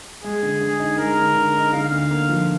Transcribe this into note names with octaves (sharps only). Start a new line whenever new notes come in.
G#3 G#4
D3
D3
D#4
G#3 A#4
D3
D3
D#4
D3 F5
D2
A#3
F3